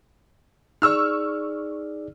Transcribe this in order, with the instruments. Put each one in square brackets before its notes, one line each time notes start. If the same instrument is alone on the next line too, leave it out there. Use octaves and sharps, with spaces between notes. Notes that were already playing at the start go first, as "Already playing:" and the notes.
[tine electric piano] D#4 G#4 D5 [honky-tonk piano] C#6 E6 F6